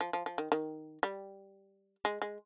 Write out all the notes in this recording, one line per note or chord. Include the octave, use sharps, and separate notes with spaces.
F3
F3
F3
D#3
D#3
G3
G#3
G#3